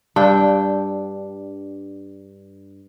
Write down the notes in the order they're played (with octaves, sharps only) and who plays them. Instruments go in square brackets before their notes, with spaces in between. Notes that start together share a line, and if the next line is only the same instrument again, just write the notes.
[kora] G2 D4 G5